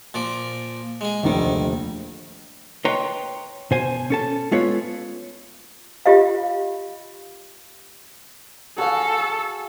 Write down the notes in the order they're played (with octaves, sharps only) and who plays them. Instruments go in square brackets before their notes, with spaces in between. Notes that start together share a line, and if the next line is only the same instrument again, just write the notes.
[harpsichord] A#2 F3 D5
G#3 G#4
[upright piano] F1 A#1 D3 [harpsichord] D#2 D#3
[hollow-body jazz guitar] B4 C#5 D#5 G5 A#5 C6
B2 C5 G#5
C#4 A4 A5
G#3 B3 F4 A4 B4 C#5
[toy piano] F4 G4 D#5 F5
[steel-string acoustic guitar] F#4 F5 [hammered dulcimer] G#4 C#6 [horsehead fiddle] A4